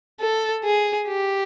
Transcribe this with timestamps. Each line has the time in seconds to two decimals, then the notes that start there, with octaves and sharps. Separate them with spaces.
0.21 A4
0.65 G#4
1.08 G4